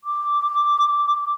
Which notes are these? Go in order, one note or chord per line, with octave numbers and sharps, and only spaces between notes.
D6